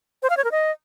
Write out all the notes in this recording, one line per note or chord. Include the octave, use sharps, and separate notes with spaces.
C5
F5
C#5
A#4
D#5